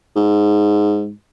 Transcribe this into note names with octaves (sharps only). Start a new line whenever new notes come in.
G#2